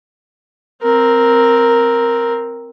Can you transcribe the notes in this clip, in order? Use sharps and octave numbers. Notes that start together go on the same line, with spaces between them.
C4 A#4